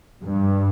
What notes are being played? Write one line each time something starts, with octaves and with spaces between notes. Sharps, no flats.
G2